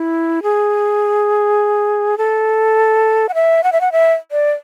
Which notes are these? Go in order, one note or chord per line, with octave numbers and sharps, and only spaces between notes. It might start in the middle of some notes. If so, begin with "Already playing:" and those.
Already playing: E4
G#4
A4
F#5
E5
F#5
E5
F#5
E5
D5